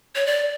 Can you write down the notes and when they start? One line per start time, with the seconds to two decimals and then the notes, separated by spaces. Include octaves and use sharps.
0.15 C#5
0.26 D5